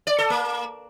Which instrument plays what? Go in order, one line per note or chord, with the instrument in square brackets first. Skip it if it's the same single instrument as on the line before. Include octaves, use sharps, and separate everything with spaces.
[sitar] D5
A4
A#3